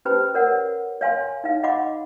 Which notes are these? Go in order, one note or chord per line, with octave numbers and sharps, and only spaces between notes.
C#4 G4 B4 C5 A5 B5
A#4 C#5 F#5
C#5 F5 G#5 C6
D#4 F5
D#5 F5 F#5 B5 C6 D6